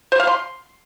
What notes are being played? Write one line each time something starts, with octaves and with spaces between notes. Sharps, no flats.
C5
F5
C6